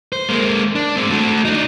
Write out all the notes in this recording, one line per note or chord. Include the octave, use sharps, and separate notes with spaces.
C5
G#3 A#3
D4
G#3 C4
A3 F#4
D4 D#4